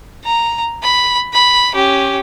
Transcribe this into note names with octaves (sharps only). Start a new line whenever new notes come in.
A#5
B5
B5
C#4 G4